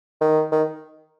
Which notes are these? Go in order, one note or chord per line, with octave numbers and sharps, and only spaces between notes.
D#3
D#3